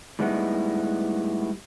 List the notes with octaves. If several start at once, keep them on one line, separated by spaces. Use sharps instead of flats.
A2 G3 G#3 B3 D#4 E4